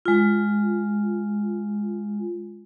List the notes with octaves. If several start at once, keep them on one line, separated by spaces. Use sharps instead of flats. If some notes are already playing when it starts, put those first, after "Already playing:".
G#3 F4